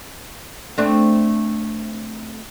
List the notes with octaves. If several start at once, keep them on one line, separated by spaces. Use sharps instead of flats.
A3 C4 D4